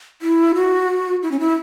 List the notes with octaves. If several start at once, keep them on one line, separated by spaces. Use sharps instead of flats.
E4
F#4
E4
C#4
E4